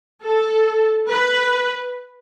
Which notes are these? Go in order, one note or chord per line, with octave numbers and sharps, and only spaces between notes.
A4
B4